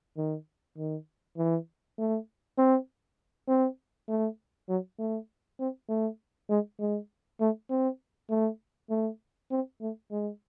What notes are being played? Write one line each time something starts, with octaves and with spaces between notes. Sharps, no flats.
D#3
D#3
E3
A3
C4
C4
A3
F#3
A3
C4
A3
G#3
G#3
A3
C4
A3
A3
C4
A3
G#3